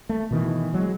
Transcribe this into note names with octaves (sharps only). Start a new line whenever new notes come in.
A3
B2 D#3 E3
F#3 G#3